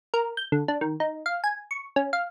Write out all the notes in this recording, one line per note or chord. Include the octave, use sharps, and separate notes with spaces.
A#4
G6
D3
D4
D#3
D#4
F5
G#5
C#6
C#4
F5